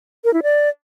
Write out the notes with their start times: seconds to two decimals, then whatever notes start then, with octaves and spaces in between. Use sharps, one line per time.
0.24 A#4
0.34 E4
0.43 D5